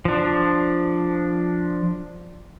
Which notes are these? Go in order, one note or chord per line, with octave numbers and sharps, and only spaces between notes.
F3 D4